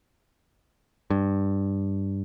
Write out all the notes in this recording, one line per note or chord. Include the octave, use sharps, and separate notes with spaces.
G2